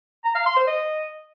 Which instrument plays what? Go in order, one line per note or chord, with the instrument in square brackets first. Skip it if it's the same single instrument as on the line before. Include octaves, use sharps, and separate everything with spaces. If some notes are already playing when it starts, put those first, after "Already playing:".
[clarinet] A#5
F5
C6
C5
D#5